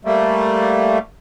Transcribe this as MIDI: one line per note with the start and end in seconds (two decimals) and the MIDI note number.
0.05 0.99 55
0.05 0.99 57
0.05 0.99 58